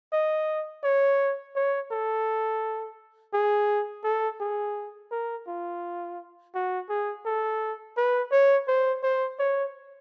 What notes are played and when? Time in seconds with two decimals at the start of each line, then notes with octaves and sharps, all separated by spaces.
0.13 D#5
0.84 C#5
1.56 C#5
1.92 A4
3.34 G#4
4.04 A4
4.41 G#4
5.12 A#4
5.48 F4
6.55 F#4
6.90 G#4
7.26 A4
7.98 B4
8.32 C#5
8.68 C5
9.04 C5
9.40 C#5